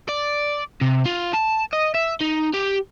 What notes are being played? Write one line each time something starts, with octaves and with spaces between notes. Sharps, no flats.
D5
C3
F4
A5
D#5
E5
D#4
G4